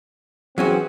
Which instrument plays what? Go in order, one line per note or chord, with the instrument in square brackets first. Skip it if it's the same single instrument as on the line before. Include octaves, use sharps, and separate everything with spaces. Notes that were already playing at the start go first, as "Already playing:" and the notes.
[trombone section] E3 C4 G#4 [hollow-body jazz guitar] F#3 C#4 F#4